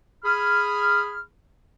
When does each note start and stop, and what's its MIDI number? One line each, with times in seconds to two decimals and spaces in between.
0.23 1.19 68
0.23 1.19 83
0.23 1.19 89